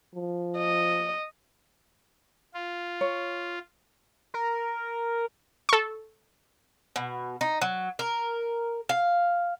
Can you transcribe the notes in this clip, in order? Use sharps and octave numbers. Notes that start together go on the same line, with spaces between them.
F3
D#5
F4
C#5
A#4
A4 C#6
B2
D#4
F#3
A#4
F5